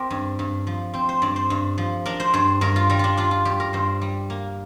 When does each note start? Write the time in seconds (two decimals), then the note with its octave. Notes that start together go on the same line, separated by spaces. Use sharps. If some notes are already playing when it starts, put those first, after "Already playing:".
Already playing: C4 G4 A#4
0.10 G2
0.39 G2
0.67 F3
0.94 C4 C5
1.09 C5
1.22 G2 D5
1.36 C5
1.50 G2
1.78 F3
2.06 D4 A#4
2.20 C5
2.34 G2 C5
2.61 G2 A#4
2.76 F4
2.90 G3 A#4
2.99 D4 F4
3.17 D4 F4
3.31 F4
3.45 G2 G4
3.60 A#4
3.73 G2 C5
4.02 G3
4.30 A#3